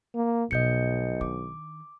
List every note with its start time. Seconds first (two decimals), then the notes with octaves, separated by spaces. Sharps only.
0.14 A#3
0.51 B1 B2 F3 D#5 G6 C#7
1.21 D#3 D4 D6